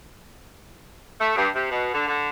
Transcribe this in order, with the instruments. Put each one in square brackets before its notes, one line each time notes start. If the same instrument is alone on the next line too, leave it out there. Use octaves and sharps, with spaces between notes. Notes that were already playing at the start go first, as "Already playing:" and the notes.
[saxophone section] A3
G2
C3
B2
D3
D3